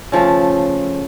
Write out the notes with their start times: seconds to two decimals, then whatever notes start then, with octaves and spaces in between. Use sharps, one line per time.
0.12 C#3 F3 A3